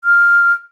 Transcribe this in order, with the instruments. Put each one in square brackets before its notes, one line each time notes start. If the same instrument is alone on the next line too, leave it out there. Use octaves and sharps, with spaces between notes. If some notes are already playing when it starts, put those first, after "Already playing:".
[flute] F6